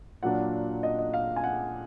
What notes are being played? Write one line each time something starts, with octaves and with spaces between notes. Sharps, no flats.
A#2 F#3 A#3 D4 F#5
D#5
D#5
F5
G#5
F#5